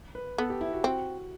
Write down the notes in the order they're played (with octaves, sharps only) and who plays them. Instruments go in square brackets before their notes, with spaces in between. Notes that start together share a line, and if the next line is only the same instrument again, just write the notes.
[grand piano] B4
[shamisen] B3 [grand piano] A4
[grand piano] G4
E4
F#4
[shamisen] C4 [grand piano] F#4